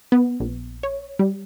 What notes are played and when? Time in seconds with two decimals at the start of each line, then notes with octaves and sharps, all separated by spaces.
0.12 B3
0.40 A#1
0.83 C#5
1.19 G3